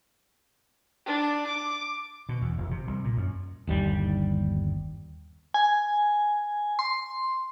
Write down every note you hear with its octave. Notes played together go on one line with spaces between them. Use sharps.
D4
D6
B2
E2
F1
C3
C2
A#2
F#2
G1 D#2 G3
G#5
C6